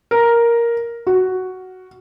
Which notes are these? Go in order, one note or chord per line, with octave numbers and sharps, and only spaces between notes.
A#4
F#4